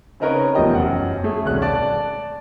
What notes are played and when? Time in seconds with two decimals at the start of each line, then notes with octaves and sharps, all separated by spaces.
0.20 C#3 C4 D#4 A#4 B4 C#5
0.54 F1 E2 F3 G3 D#5 G5
0.74 F#2 F#5
1.24 A3 G#4
1.44 E1 C2 D#3 C#4 F#6
1.62 D5 A5